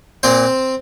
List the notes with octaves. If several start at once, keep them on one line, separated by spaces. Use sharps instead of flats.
A#2 C4 C5